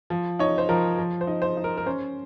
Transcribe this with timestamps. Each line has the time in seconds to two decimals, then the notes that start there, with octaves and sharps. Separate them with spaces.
0.10 F3
0.39 D#4 C#5
0.58 C5
0.69 F3 A#4
0.98 F3
1.21 C5
1.27 D#4
1.42 C5
1.57 D#4
1.64 A#4
1.77 A#4
1.86 C#4 C5